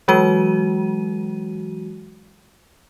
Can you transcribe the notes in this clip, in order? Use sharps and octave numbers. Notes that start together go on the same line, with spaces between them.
E3 F#3 G#3 F#4 D#7